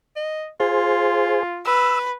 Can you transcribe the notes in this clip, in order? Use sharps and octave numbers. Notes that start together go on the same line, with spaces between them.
D#5
F4 G#4 C5
B4 E6